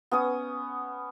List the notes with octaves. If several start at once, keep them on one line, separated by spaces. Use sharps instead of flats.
B3 C#4 D#6